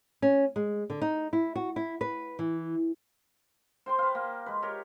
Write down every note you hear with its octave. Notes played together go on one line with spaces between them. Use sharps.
C#4
G#3
D3
D#4
E4
F#4
E4
B4
E3
C5 G5 C6
B4 F5
A#3
G#3 B4
G4 A#4 C#5